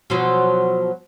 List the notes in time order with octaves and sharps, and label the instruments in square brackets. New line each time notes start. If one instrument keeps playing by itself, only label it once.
[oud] B2 F3 F#3